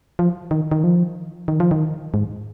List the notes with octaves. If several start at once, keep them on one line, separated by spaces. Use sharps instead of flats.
F3
D#3
D#3
F3
D#3
F3
D#3
G#2